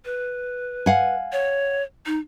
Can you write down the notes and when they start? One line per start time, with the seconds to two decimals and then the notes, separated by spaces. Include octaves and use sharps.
0.05 B4
0.86 F5 F#5 G#5
1.32 C#5
2.06 D#4